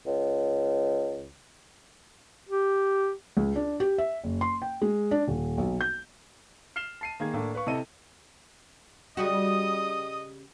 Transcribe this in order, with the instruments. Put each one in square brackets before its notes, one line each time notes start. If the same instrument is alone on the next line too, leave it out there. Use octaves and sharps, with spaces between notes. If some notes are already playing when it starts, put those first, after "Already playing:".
[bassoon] C#2
[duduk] G4
[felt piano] C#2
D4
G4
E5
F#1
C6
G5
G#3
D4
D#1
B1
G6
[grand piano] F6 C7 E7 G7
A5 C7 D#7
D#3 A#3 G#4 G#6
A2 A#3 D4
B4 F5 C#6
C3 E4 A4 D#5 D#7
[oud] C#3 G3 F#4 [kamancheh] D#5 D#6